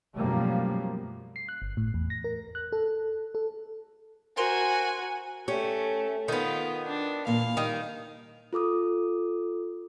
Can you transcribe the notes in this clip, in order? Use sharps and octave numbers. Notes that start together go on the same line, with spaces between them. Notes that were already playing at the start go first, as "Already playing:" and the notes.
F#2 B2 F3 G3 A3 A#3
C7
F#6
G1
A2
E2
A#6
A#4
F#6
A4
A4
F#4 A#4 C5 G#5
A3 C#4 G4
D#3 B3 F4
D4
A#2 E3 A#3 F5
D#3 G3
F4 A4 D6 D#6